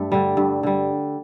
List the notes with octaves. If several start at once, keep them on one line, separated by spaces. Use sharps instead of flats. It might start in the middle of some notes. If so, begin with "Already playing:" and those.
Already playing: G2 A3
D3 G3
G2
D3 G3